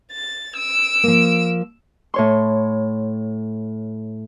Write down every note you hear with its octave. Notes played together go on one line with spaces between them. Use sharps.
A6
E6 D7
F3 A#3
A2 C#5 C6